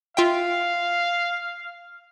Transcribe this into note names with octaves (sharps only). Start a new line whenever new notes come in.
F4 E5 F5 G5